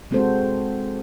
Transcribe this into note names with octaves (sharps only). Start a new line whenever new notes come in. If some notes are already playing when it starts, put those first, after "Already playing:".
G#3 C4 F#4 A4 C5